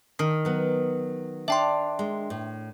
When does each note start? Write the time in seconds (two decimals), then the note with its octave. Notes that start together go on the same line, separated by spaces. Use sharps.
0.19 D#3
0.45 F#3 B3
1.48 D4 E5 G5 C6
1.99 G#3
2.30 A2